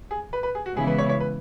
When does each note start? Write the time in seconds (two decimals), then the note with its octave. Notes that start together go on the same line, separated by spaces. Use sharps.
0.11 G#4
0.33 B4
0.43 B4
0.55 G#4
0.66 F#4
0.76 C#3 E3 G#3 B3 E4 G#4
0.87 B4
0.98 C#5
1.09 C#5
1.20 B4